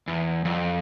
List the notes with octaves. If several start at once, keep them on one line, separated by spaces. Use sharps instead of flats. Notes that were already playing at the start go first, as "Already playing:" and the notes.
E2
F2